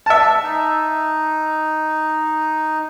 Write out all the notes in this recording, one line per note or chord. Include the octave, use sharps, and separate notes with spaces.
E5 A5
D#4